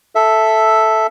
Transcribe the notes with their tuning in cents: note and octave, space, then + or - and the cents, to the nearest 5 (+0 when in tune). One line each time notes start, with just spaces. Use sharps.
A4 +0 E5 +0